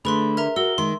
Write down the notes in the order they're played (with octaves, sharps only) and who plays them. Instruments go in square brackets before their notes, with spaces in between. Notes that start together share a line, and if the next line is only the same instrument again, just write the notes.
[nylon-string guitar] D3 [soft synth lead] A3 [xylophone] G#4 B4 C6 [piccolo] B5
[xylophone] A#4 E5 A#5
[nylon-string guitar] F#4 [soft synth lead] A#4 [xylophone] E6 [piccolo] G7
[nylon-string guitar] D#3 [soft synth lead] G#3 [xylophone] C6